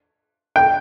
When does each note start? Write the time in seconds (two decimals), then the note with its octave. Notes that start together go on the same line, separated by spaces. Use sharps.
0.56 G5